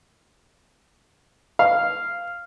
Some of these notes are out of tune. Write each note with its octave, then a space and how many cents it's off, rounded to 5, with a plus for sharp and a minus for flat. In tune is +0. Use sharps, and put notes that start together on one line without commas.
F5 -5